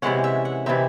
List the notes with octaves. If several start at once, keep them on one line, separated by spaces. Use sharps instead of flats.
C3 E3 G#3 C#4 F#5
E5
F#5
C3 E3 C4 D#4 E5